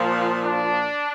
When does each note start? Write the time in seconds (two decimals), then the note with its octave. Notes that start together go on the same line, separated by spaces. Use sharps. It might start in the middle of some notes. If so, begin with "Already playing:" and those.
Already playing: A#2 F3
0.43 D4